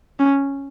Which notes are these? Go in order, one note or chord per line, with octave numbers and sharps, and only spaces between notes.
C#4